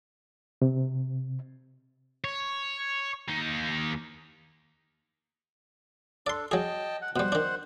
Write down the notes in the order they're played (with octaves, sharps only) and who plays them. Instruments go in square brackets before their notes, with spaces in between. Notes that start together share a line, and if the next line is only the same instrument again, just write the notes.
[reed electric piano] C3
[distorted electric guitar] C#5
D#2 D#4
[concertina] D4 A4 [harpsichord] D5 C6
[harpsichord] F#3 G#4 [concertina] D#5 G5 A5
[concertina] F#5
[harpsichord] B2 G3 [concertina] C5 F#5
[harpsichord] D#3 D4